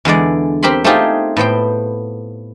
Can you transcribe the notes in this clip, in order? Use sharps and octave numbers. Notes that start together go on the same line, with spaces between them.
E2 D3 G#3 D5
C4 G4 A#4 B5 C6
A3 C4 D#4 F4 G4 G#4
A2 B3 C5 G5